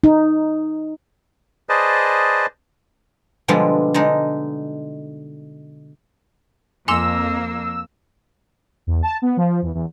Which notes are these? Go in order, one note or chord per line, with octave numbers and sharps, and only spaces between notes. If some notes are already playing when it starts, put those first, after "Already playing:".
D#4
G#4 B4 C5 D5 D#5 A5
B2 D3 F3 G3 G#3
D3 G#3 D#4
F2 A#3 G#5 C6 D6 E6
E2
A5
B3
F3
E2
E2